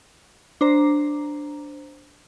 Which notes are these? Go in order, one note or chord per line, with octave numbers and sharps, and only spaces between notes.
D4 C5 A#5